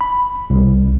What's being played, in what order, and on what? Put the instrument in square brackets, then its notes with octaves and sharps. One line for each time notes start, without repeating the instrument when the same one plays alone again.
[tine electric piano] B5
C2